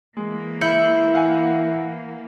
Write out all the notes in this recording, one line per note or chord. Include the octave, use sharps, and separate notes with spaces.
E3 G#3 A#3
E4 E5 G6 C#7
F5 F#5 G#5